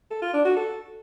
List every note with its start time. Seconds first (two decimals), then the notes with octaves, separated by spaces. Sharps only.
0.11 A4
0.22 F4
0.34 D4
0.45 F#4
0.56 A4